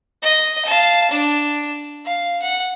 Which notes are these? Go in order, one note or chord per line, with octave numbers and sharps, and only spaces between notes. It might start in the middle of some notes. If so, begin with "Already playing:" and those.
D#5
F5 A5
D4
F5
F#5